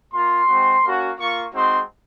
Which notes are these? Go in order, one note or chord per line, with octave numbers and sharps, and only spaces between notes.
A#3 F4 C6
G#3 C4 F#4
A#3 C#4 F#4
A#3 F4 C#6
G#3 C4 D#4 F#4 C6